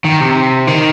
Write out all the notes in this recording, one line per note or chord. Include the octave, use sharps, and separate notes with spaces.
D#3
C3
D#3